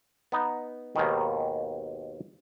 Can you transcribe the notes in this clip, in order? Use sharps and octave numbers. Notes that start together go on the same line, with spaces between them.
B3 D#4
D#2 G#2 B2 D#3